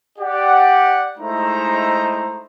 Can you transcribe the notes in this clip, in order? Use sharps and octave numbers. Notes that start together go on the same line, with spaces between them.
G4 D5 F#5
G#3 A3 D#4 E4 C5 A#5